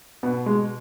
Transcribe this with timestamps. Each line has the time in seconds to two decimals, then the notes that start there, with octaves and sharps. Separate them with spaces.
0.23 B2 B3
0.46 G#3